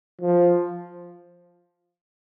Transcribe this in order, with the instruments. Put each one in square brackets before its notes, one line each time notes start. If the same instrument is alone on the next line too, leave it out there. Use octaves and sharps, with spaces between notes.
[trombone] F3